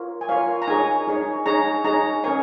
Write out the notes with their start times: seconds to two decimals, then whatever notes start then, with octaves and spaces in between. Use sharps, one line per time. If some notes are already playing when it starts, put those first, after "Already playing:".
Already playing: F4 A#4 C#5
0.21 G#5
0.29 F4 A#4 C#5 F5
0.62 A#5
0.68 D#4 G#4 C#5 G#5
1.07 D#4 G#4 C#5
1.46 D#4 G#4 C#5 A#5
1.84 D#4 G#4 C#5 A#5
2.24 C#4 A#4 C#5 G#5